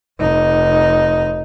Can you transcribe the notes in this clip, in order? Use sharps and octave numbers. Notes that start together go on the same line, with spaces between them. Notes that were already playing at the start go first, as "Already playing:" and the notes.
F1 D#4